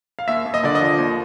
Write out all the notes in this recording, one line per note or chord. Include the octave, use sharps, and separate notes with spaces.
F5
D#2 E5
D#2
D#5
D3 D5
D#5
F3
D#2